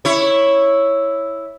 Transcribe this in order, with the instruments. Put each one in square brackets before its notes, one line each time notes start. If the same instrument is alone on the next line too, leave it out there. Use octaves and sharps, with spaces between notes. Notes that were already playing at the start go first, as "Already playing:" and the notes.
[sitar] E4 C#5